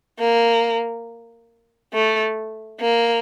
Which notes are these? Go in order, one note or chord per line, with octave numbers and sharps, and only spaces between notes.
A#3
A3
A#3